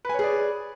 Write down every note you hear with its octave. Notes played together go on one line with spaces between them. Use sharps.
G#4 B4 C#5 D5 G#5